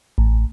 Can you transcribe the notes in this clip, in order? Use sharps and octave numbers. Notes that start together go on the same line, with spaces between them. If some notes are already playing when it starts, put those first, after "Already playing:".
A1